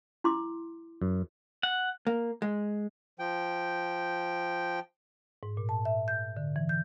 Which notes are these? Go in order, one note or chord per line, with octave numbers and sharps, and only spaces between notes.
E4 C6 D6
F#2
F#5
A#3
G#3
F3 G5
G#2
A#2
A5
E5
G6
D3
E3
G6